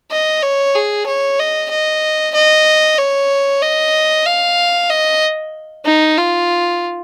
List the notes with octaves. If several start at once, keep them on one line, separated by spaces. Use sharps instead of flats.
D#5
C#5
G#4
C#5
D#5
D#5
D#5
C#5
D#5
F5
D#5
D#4
F4